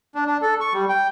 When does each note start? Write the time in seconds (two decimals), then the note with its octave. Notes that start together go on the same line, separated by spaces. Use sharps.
0.15 D4
0.27 D4
0.42 A4
0.61 C#6
0.74 G3
0.89 G5